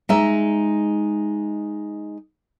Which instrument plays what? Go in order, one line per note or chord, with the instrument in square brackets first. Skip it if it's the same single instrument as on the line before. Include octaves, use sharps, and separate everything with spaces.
[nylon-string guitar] G#3 D#4 E5